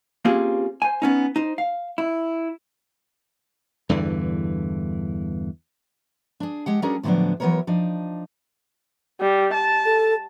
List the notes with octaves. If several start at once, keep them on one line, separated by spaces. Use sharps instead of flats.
A#3 C4 C#4 F4 G4 G#4
C5 G#5
B3 C#4 D#4
D#4 C5
F5
E4
E2 G2 D3 E3
D4 G#4
G#3 G4 F#5
G3 C#4 D4 F#4 G#4 A#4
A2 D3 F3 F#3 B3 D4
E3 F#3 G#3 B3 A#4 C#5
F3 D4 D#4
G3
A5
A4